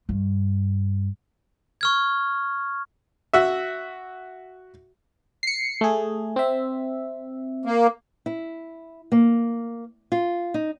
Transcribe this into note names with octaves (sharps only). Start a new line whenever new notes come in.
G2
C#6 F6 G#6
F#4 E5
C7 C#7
A3 G#4
C4 E5
A#3
E4
A#3
F4
D#4